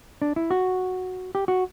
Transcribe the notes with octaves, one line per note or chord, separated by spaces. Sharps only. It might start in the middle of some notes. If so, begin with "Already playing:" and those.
D4
E4
F#4
G4
F#4